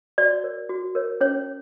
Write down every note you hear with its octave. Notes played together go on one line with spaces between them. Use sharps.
F#4 D5
A#4 C#5
F#4
A#4 C#5
C#4 C#5